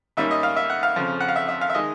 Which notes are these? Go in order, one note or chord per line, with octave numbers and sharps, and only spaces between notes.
G#2 D#3 G3 A#3 C#4 E5
D#5
F5
E5
F#5
F5
F2 C#3 F3
F#5
F5
E5
E5
F5
E5
D#3 G#3 D#5